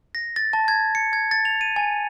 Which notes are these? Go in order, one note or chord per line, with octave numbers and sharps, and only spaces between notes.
A#6
A6
A5
G#6
C#7
G#6
A6
F7
D#7
G#5